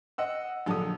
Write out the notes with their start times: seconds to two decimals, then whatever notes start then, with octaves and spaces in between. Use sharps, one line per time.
0.18 D#5 F#5 E6
0.66 A#1 D3 F#3 G4 A5 D#6